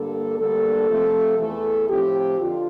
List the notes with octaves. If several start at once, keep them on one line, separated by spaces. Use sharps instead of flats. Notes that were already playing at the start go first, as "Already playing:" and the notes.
Already playing: G2 D3 G3 A#3 A4
D2 D3 G3 A#3 A4
C3 F3 A3 C4
E2 E3 A3 A4
A2 F3 C4 G4
F2 D3 F4